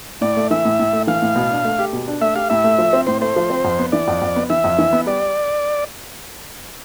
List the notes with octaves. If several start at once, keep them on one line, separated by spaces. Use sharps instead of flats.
A2 D5
A3
E3 E5
A2
A2
A3
E3 F5
A2
B2
D4
A3
G4
B2
D4
A3 E5
G4 F5
A2 E5
A3
F3
C4
A2 C5
A3 C5
F3
C4
F2
B3
E3 D5
F2
F2
B3
E3 E5
F2
E3
B3
G3 D5